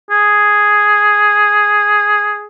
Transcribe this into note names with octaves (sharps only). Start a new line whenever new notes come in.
G#4